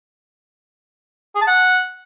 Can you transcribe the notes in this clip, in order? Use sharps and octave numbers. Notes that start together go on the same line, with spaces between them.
G#4
A5
F#5